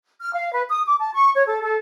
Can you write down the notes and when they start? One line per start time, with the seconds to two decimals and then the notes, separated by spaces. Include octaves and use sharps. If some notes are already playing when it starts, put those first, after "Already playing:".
0.21 F6
0.33 F5
0.52 B4
0.69 D#6
0.86 D6
0.98 A5
1.13 C#6
1.34 C#5
1.46 A4
1.61 A4